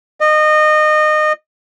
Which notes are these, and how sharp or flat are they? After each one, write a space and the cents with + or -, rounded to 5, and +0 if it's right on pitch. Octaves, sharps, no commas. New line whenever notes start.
D#5 -25